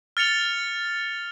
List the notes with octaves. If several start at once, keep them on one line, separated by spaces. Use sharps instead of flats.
F6 A6 C#7 F7 G7